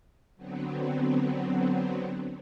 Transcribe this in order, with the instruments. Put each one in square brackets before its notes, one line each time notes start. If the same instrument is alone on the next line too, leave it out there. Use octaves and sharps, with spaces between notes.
[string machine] D3 F#3 B3 C4